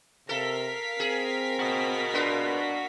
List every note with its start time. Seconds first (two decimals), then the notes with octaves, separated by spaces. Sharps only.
0.29 C3 A4 A#4 F5 B6
1.00 C4 G#4
1.59 F#4 D#5
2.14 B3 D4 F4